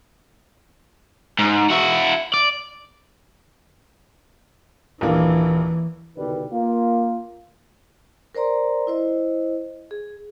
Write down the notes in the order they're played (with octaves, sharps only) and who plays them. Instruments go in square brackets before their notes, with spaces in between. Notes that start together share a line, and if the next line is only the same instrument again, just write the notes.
[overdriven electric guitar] G#2
E4 F#4
D5
[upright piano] D#1 G2 A#3 [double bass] E3
[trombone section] C2 B2 D3 D#3 G3 B4
A#3 F4
[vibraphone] A#4 C5 D5 A#5 C6
E4 C5 D#5
G#4